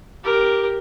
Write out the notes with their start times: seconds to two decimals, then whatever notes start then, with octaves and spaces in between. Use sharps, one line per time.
0.24 G4 A#4